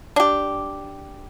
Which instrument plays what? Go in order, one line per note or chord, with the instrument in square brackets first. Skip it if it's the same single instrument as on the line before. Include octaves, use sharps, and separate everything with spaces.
[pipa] D4 G4